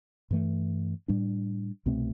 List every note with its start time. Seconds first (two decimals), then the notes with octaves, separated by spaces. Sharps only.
0.31 G2 E3 A3
1.08 A2 G3 D4
1.86 C2 B2 A3 C4